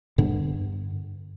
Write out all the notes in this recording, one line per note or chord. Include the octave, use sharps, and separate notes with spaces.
G2 D3 B3